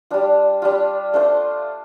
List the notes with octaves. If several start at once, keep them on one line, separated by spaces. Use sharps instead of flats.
G3 D4 F4
G3 D4 F4
A3 D4 F4 C5